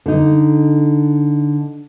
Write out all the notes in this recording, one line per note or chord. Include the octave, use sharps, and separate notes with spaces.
D3 D#4